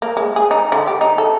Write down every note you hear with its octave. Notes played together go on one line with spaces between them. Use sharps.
A#3
G#3
G#4
D#4
D3
G4
D#4
A4